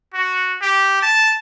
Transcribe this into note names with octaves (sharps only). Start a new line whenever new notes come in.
F#4
G4
A5